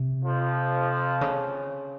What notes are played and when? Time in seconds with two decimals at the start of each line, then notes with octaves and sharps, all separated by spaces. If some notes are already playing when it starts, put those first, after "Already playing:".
Already playing: C3
0.23 F2 F3
1.21 C#3